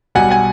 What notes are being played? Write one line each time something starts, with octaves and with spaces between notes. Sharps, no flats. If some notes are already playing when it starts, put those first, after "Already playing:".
B1 B2 G3 F#5 G#5
F#5 G#5